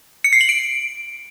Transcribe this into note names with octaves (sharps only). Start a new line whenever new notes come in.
C#7
C7
F#7
D7